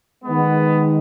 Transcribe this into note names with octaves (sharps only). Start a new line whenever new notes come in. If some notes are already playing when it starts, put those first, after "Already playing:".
D#3 G#3 B3